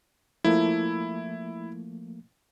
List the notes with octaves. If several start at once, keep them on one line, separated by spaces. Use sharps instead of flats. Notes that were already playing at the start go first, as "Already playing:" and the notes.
F3 A3 A#3 E4